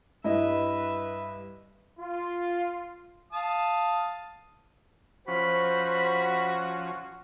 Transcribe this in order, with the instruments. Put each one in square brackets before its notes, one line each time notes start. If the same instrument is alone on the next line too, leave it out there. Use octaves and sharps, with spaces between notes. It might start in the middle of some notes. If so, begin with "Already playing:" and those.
[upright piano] G2 [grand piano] E4 D#5 [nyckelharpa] B4 E5
[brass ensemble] F4
[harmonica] F5 A5 D#6
[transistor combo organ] F3 C#4 [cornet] F#4 [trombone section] C5 [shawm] B5